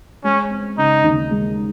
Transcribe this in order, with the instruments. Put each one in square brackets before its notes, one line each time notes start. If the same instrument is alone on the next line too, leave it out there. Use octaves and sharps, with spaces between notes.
[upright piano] G#3 [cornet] C#4
[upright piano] C4
[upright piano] C#3 [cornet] D#4
[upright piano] D#2
G#3